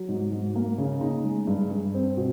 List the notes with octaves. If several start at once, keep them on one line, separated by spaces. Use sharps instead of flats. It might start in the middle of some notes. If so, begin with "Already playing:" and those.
Already playing: F#3
G#2
G#2
A#3
C#3
D#4
G#3
G2
G2
C4
B2